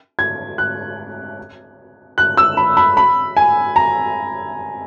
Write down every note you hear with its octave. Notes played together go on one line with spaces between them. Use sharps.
G#6
F#6
F#6
E6
B5
B5
B5
G#5
A#5